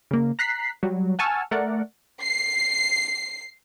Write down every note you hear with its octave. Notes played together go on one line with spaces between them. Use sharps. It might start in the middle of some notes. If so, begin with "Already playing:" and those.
C#3 A#3
A#5 F#6 B6 C7
F#3 G3
F#5 G#5 A5 C#6 E6 F6
A3 A#4 D5 F#5
C7